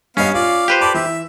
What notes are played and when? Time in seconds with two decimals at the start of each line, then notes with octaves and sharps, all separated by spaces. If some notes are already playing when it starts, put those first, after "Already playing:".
0.17 G2 B3 C#4 D#5 F5
0.34 F4 D5 F5
0.68 G4 B4 C5
0.81 A4 D5 B5
0.94 E3 E5